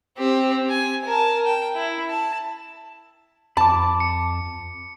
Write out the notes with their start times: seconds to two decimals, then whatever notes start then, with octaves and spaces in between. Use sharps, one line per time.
0.18 C4 G4
0.69 G#5
1.05 A#4 A5
1.46 G5
1.76 E4
2.09 A5
3.57 F2 A5 B5 D6
4.00 C#7